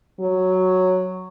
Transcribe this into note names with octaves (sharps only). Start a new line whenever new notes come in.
F#3